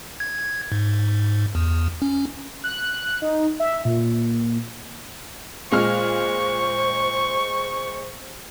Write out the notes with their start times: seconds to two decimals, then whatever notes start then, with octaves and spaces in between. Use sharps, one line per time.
0.20 G#6
0.72 G#2
1.55 E2
2.02 C#4
2.64 F#6
3.22 D#4
3.60 E5
3.85 A#2
5.71 A#2 G#3 C5 C#6 F6